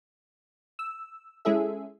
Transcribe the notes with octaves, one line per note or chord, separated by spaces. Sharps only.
E6
G#3 C#4 E4 G#4 A4 E5